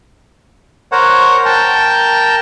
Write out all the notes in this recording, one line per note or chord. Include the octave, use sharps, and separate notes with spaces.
A#4 C5 C#5 F#5
A#4 G5 A5